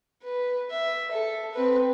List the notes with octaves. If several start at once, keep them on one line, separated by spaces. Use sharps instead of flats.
B4
E5
A4
C4 B4